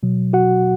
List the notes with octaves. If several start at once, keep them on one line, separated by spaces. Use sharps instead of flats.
B2 F#3
F#4 F#5